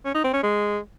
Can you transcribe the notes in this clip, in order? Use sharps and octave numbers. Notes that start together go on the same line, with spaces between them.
C#4
D#4
C4
C#4
G#3